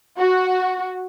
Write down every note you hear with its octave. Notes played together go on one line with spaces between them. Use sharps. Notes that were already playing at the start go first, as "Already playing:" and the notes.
F#4